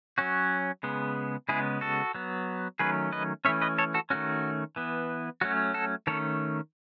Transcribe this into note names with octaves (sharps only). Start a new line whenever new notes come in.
F#3 C#4 F#4
C#3 G#3 B3
C#3 G#3 B3 E4 G#4
F#4 A4
F#3 B3
D#3 F#3 A3 C#4 G#4 B4
B4 D#5
E3 A3 C#4 C#5 E5
B4 D#5
A4 C#5
F#4 A4
D#3 A3 C#4 F#4
E3 B3
F#3 A3 C#4 F#4
F#4 A4
D#3 A3 C#4 A4 C#5